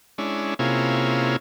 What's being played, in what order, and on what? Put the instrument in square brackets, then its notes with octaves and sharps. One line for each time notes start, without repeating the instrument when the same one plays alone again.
[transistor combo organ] G#3 C#4 D4 E4
C3 A#3 C#4 E4 F4 G#4